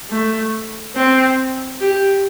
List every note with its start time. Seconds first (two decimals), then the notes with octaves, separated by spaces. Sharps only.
0.10 A3
0.95 C4
1.81 G4